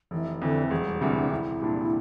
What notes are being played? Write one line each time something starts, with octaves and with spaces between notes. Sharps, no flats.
F1 E3
F2 D3 E3
E1 E3
F3
G3
D2 C3 E3 G3 D4
D4
C2 E4
A#2 G3 D4